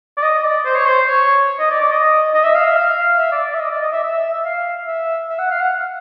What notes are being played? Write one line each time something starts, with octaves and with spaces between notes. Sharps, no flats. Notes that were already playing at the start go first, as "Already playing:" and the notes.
D5
D#5
D#5
D5
C5
C#5
C5
C#5
D#5
D5
D5
D#5
D#5
E5
F5
E5
F5
E5
D5
D5
E5
D#5
D5
D#5
E5
E5
E5
F5
E5
E5
F#5
F5
F#5